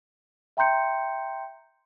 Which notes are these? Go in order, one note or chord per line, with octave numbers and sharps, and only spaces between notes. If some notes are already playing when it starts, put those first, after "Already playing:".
E5 G5 A#5 C6 G6 C#7